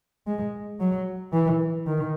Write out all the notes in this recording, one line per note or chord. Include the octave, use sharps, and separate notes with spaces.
G#3
F#3
E3
D#3